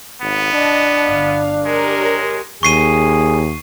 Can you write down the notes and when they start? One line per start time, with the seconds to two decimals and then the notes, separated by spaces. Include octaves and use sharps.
0.22 G#1 B3
0.53 D4 D#5 A5
1.05 G1 F5
1.65 G#3 G4 A#4 C#5
2.63 D#2 G#4 C#6 C7 D#7